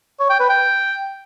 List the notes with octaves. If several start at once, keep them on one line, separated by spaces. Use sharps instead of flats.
C#5
G5
B4
G5